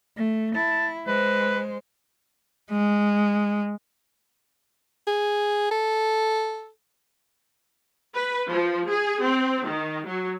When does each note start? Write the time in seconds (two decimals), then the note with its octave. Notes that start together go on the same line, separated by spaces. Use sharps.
0.17 A3
0.56 E4 A5
1.07 G#3 B4 C5
2.71 G#3
5.07 G#4
5.71 A4
8.15 B4
8.50 F3
8.89 G#4
9.25 C4
9.67 D#3
10.07 F#3